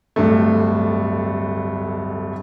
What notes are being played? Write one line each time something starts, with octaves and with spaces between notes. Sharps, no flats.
D1 G2 A3